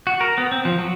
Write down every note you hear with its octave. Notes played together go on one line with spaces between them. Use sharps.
F#4
A#4
B3
C4
F3
F#3